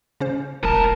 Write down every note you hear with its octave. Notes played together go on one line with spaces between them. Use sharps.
C#3 C#4 C5
E1 A#1 A2 A#4 A5